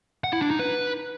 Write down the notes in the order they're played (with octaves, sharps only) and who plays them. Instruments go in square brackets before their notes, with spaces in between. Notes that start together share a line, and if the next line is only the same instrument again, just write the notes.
[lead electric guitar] F#5
E4
D4
D#4
B4